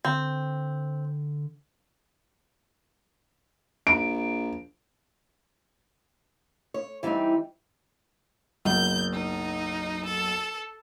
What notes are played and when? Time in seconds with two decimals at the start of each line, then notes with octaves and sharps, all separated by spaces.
0.05 D3 C4
3.87 A#1 D7
6.74 C#5
7.03 E3 G3 C4 D4 D#4
8.65 F#1 B1 G6
9.13 D#4
10.05 A4